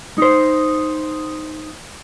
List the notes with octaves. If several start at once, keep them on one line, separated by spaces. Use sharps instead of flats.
D#4 C5